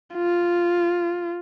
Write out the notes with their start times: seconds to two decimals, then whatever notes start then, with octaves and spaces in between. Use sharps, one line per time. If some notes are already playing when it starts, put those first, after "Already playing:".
0.15 F4